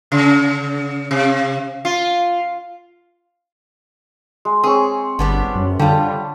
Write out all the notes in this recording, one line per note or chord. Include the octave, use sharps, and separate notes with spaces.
C#3
C3
F4
G#3
C4 G#4 C#5
G1 G3 B3 D4
F#2
D3 G3 F4 A5